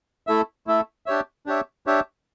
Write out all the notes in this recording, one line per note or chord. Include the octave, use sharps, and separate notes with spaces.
A3 E4 A4 E5
A3 E4 A4 E5
D4 G4 C#5 E5
D4 G4 C#5 E5
D4 G4 C#5 E5